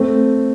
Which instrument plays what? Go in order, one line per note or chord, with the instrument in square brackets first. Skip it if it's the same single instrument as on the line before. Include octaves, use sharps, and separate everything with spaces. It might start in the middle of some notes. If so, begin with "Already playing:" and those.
Already playing: [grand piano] A3 C4